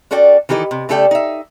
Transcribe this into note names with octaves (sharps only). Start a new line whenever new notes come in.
C#4 F#4 A4 D5 G5
D#3 E3 G4 A4 D#5
C3
C#3 A3 G4 A4 D5 G5
D#4 E5